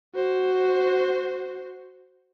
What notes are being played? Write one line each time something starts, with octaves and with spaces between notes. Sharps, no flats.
F#4 C5